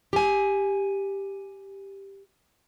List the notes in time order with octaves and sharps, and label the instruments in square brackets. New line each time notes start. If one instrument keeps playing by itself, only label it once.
[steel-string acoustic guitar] G4 G#5